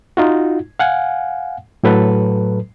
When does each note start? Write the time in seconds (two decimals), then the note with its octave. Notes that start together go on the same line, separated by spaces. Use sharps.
0.17 D#4 F4 F#4
0.79 F5 F#5 G#5
1.83 A2 F#3 A4 B4